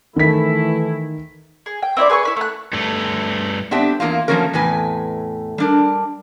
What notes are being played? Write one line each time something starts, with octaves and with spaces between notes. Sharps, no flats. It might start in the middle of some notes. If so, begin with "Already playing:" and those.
D#3 E3 A3 E4 B6
G#4
G5
C4 E4 C#5 D5
G#4 B4 C6 C#6
E4 B4 C#6
A3 F#6
G2 A3
B3 C4 D4 G4 E5
E2 A#3 E4 F4
F3 A3 A#3 C#4 F#4 A#4
E2 A2 C3 B4 G#5
G3 D4 A#4